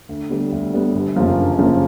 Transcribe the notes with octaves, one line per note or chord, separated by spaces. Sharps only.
D2
D3 G3 B3
D2
D3 G3 B3
G1
F#2 C#3 F3 A#3
G1
F#2 C#3 F3 A#3